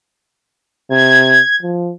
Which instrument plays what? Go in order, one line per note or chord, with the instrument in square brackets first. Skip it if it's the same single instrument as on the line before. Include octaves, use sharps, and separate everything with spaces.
[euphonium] C3 [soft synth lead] G#6
[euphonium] F3